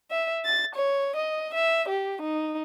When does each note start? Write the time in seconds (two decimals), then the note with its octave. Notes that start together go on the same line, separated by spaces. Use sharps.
0.11 E5
0.45 A6
0.76 C#5
1.17 D#5
1.54 E5
1.90 G4
2.23 D#4